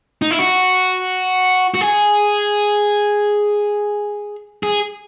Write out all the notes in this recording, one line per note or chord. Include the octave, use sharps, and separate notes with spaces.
D#4
E4
F#4
F#4
G#4
G#4